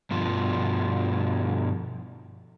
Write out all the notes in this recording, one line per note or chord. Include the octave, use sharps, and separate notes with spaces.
G2 B2 F3